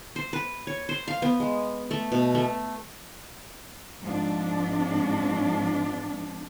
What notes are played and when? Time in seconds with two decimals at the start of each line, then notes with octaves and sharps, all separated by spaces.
0.16 C5
0.33 B4
0.67 C#5
0.89 C5
1.08 F5
1.22 B3
1.40 G#3
1.91 A3
2.12 B2
2.35 A3
4.00 G#2 F3 C4 D4